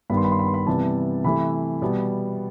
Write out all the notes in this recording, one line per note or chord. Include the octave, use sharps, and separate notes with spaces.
G2 D#3 G3 B3 B5
C6
B5
C6
B5
C6
B5
C3 E3 G3 B3 A5
C3 E3 A3 B5
B2 G3 B3